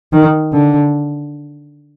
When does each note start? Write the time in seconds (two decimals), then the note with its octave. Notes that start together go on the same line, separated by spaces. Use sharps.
0.12 D#3
0.52 D3